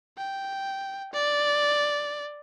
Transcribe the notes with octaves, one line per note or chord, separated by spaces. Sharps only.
G5
D5